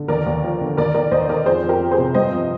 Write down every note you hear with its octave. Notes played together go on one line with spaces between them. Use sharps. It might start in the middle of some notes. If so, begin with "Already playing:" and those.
Already playing: D3
D#2 A#4 D5
D#2
F3
D3
D#2 A#4 D5
D#3 A#4 D5
D#2 C5 D#5
D#3 A#4 D5
F2 G#4 C5
F2
G4 A#4
F3
G#4 C5
C3
G2 C5 D#5
F3